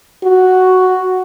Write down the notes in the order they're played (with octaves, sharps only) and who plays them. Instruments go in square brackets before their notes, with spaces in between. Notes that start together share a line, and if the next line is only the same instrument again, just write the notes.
[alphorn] F#4